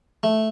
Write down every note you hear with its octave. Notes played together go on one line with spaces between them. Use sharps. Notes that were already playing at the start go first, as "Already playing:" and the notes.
A3